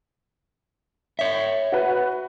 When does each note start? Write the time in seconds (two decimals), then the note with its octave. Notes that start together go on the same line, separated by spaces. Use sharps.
1.19 C#5 E5
1.72 F#4 B4